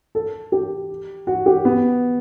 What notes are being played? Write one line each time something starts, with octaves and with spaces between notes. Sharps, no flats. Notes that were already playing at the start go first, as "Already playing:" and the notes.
A4
G4
F#4
G4
B3